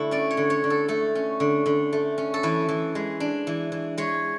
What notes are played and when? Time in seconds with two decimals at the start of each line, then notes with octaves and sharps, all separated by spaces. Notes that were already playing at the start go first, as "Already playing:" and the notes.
Already playing: D3 A3 E4 F#4
0.11 C#4 D5
0.31 C#5
0.37 D3
0.50 C#5
0.64 D3
0.70 A4
0.88 A3 A4
1.15 C#4
1.40 D3
1.66 D3
1.93 A3
2.18 C#4
2.34 A4
2.43 E3 B4
2.69 E3
2.95 G#3
3.20 D4
3.47 E3
3.72 E3
3.98 G#3 C#5